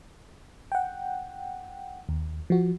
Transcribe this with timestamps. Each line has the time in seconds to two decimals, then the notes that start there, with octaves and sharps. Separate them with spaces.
0.72 F#5 G5
2.09 D#2
2.50 F3 F#4